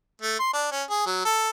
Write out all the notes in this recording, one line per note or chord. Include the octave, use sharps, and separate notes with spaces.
A3
C6
D4
C#4
G#4
F#3
A4